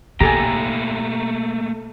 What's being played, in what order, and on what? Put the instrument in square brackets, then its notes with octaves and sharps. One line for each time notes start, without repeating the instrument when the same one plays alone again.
[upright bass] B2 [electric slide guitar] A3 A#3 G5 [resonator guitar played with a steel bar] G4 A4 G#5 [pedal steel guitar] A#5